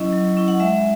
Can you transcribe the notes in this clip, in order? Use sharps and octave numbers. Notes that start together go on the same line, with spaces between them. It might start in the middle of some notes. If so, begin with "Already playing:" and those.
Already playing: F#3 C#4 E4 D#5
F#3
C#4 E4
F#5
G#3 E5